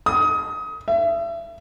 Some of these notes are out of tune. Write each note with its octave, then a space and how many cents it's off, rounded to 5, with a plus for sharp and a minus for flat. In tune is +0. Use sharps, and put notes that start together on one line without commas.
D#6 +25
E5 +35